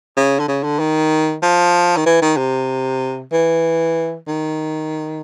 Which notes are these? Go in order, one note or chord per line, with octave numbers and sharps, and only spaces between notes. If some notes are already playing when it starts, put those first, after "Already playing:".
C#3
D3
C#3
D3
D#3
F3
D#3
E3
D#3
C3
E3
D#3